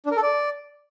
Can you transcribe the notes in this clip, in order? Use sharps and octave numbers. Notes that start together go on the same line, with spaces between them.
D4
A#4
A4
D5